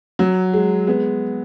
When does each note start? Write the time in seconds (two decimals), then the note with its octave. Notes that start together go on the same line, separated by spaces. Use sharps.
0.19 F#3
0.54 G#3
0.87 G#3 B3